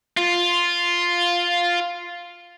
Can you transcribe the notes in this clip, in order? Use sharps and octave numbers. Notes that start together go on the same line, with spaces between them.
F4